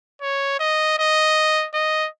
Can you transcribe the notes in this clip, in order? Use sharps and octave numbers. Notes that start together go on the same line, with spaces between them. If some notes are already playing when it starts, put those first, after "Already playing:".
C#5
D#5
D#5
D#5